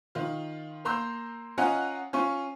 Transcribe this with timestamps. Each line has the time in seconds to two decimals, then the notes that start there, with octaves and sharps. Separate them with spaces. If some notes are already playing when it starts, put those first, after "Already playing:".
0.15 D#3 F4
0.85 A#3 A#5 C6 E6 G6
1.58 C#4 F4 D#5 F#5 G#5 A#5
2.13 C#4 F4 C#6